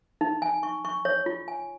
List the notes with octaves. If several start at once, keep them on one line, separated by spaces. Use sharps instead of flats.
D#4
G#5
C#6
C#6
C#5
F4
G#5